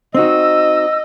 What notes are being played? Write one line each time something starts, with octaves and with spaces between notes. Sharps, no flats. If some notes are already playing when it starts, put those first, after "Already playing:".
C4 D#4 F#4 D#5 E6